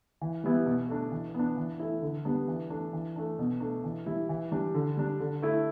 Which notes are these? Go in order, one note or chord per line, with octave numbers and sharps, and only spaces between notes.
E3
G3 B3 E4
B2
A3 D4
E3
B3 D4
E3
A3 E4
D3
G3 B3 D4
E3
A3 D4
E3
A3 D4
B2
A3 D4
E3
G3 E4
E3
G3 D4
D3
G3 D4
D3
A3 E4